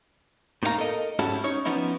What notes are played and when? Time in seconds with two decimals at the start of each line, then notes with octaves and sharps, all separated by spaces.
0.63 A2 A#3 D#4 E4 F5 A#5
0.78 A4 A#4 D#5
1.19 G#2 C#4 E4 F#4 G4 A4
1.44 C#4 D#4 C#5
1.65 F3 B3 C#4 D#4 E4